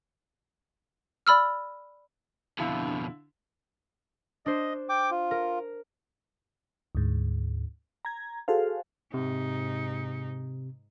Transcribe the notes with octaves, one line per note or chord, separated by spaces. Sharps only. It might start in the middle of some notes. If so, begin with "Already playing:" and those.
D5 B5 E6 F6
F2 B2 D3 D4 E4 F5
D4 C5 D#5
G5 D6
F4
A#4
D2 G#2
A#5 G#6
F#4 G#4 A4 C5 F5
G#2 C3 D#4